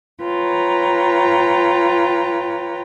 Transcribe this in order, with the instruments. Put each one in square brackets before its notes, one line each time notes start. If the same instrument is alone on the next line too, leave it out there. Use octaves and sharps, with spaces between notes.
[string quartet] F4 B4 C#5 G5 A#5